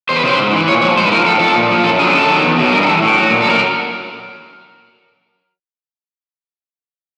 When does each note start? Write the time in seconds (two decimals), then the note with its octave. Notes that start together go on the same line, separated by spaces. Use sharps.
0.09 E2 C5
0.16 B4
0.24 C#3 F#3 C5
0.38 G#2
0.52 E3
0.68 A#2 C#5
0.81 F3 C#5
0.97 G#2 C5
1.05 B4
1.11 F3 A#4
1.26 A2 A4
1.40 F3 A4
1.55 A#2
1.70 F3
1.84 F#2 A4
1.99 D3 G#4
2.02 F#3
2.14 F#2 A4
2.29 D#3 F#3
2.43 E2
2.58 B2 F#3
2.72 G2 A#4
2.83 G#4
2.86 E3 A4
3.02 A2
3.17 F#3
3.30 A#2
3.42 A4
3.46 F#3 A#4